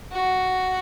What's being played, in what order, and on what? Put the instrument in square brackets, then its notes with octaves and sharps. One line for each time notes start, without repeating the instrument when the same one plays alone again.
[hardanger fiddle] F#4